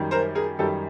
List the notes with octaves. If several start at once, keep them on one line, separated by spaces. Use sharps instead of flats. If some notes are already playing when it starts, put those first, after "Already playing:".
Already playing: F#2 D#3 G3
A#4 C5
G#4 A#4
F#2 D#3 G3 G4 A4